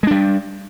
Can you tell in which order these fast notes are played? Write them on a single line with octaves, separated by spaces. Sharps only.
G#3 D4 G3